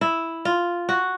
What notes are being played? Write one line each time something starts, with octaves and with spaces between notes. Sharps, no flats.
E4
F4
F#4